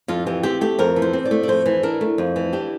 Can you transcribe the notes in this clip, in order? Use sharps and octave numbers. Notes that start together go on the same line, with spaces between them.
F2 F4
E3 G4
C4 G4
A3 G4
F2 A#4
E3
C5
C4
D5
A3
D5
F2 C5
E3
D4 A#4
A3
F2
E3
D4 G4